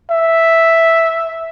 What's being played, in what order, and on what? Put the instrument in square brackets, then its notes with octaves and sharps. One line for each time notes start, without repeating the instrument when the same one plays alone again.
[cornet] E5